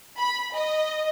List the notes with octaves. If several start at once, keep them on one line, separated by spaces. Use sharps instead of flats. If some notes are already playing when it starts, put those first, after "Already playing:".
B5
D#5